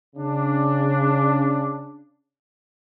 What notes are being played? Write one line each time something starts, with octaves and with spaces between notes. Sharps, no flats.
C#3 D4